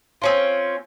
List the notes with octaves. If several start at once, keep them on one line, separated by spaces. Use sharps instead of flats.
C4 C#4 F4